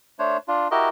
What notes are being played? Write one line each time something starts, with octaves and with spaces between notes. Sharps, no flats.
A3 D4 C5 C#5
D4 F4
E4 F#4 G4 A#4 D#5